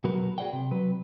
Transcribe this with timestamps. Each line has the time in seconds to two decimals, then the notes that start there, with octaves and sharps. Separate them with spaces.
0.04 B2 F#3 F#4 A#4 B4
0.38 F#4 G#4 C#5 D5 F#5 G5
0.53 C3
0.71 F#3 B4